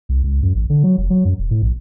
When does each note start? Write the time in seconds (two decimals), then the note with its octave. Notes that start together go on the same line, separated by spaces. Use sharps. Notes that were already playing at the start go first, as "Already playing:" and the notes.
0.09 C2
0.23 C#2
0.43 F#2
0.55 A1
0.70 D3
0.84 F#3
0.98 F1
1.10 F#3
1.25 F#2
1.39 D#1
1.51 A2
1.62 A#1